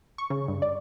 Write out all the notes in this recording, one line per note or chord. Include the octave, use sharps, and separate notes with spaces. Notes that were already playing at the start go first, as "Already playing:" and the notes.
C#6
C#3
G2
D5